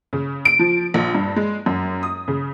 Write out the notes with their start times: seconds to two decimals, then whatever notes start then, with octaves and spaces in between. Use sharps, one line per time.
0.13 C#3
0.45 D7
0.59 F3
0.94 A#1
1.14 G2
1.36 G#3
1.66 F#2
2.03 D#6
2.28 C#3